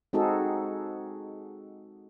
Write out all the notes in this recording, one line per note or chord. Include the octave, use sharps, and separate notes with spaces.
G#3 C4 D#4 F#4 G#4 A4